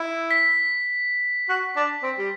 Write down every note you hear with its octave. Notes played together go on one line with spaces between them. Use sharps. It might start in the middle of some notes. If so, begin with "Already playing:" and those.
Already playing: E4
B6
F#4
D4
C4
G3